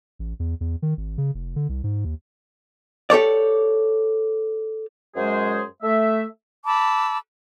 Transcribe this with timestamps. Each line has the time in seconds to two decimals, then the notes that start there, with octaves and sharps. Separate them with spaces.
0.19 A1
0.40 E2
0.61 E2
0.82 D#3
0.97 G#1
1.18 C#3
1.35 F1
1.56 D3
1.69 C2
1.84 G#2
2.05 D#2
3.10 G4 A4 C#5 D5
5.16 F#2 G#3 G#4 C5
5.82 A3 E5
6.66 A5 B5 D6 E6